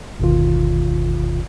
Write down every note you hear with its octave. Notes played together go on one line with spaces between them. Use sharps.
G1 D#2 B2 D#3 F4